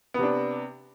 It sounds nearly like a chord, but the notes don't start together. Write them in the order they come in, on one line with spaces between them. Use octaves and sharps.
B3 C3 D4